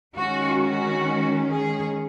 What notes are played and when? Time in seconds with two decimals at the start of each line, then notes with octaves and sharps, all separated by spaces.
0.15 D#3 G#3 C#4 F#4
0.61 F#4
1.51 G#4